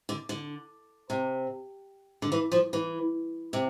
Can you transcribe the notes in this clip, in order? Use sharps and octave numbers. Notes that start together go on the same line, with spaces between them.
D3
D3
C3
D3
E3
F3
E3
C3